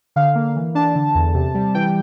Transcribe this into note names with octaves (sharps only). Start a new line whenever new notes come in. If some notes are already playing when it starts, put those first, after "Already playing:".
D3 F5
A#3
E3
D4 A5
D3
E2
C3
G3
E3 G5